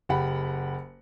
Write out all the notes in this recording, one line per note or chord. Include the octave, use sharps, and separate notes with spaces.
F#1 G4 F#5 B5